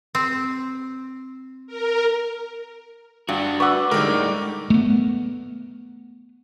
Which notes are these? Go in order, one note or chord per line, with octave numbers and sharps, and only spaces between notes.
C4
A#4
G2 D4 F#4
B4 F#5 C#6 D6 E6
A2 D3 G3 G#3 D#4 G4 A#4
A3 B3